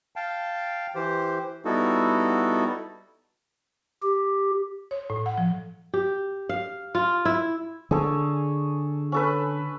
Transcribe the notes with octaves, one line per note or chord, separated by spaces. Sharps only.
F5 G5 A5
E3 G4 C5
G3 B3 D#4 E4 F#4 A4
G4
C#5
A2
F#5
F3
G4
F5
F4
E4
D3 G#4 A4 C#5
C#4 A4 B4